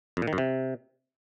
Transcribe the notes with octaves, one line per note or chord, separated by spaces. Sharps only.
F2
A#2
D#3
F#2
C3